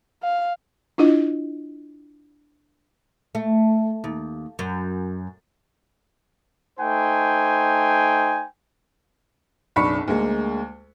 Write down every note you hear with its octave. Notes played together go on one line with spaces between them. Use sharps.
F5
D4 E4 F4 D#5
A3
D#2
F#2
A3 D#4 C5 G5 G#5
F#1 B1 D4 B5 C#6 C#7
D2 G#3 A#3